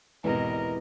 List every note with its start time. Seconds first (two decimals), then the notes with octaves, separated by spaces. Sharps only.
0.24 G#1 E2 B2 E3 G4 A#4 D#5